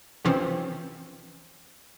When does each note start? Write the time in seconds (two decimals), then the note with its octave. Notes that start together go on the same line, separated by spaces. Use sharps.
0.25 C3 E3 F3 C4 C#4